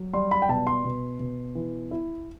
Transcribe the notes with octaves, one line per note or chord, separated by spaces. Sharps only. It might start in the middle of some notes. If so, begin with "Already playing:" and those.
Already playing: F#3
G3 C6
B5
G5
B2 A5
C6
B2
B2
E3
E4